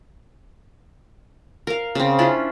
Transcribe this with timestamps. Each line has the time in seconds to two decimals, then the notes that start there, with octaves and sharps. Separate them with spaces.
1.67 A#4 F5
1.95 C#3 C4
2.19 C#4 D4 E4 F4